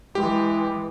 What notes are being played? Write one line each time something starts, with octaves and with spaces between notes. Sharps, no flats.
E3 G#3 G4